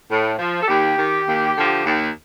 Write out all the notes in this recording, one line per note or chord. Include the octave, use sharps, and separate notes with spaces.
A2
F3
A4
D#2 G4
D#3
D#2
D3 F3
D#2